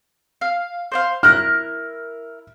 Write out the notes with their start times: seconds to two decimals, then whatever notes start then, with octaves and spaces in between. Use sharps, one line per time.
0.41 F5
0.92 C5 D5 F5
1.23 E4 A#4 F6 F#6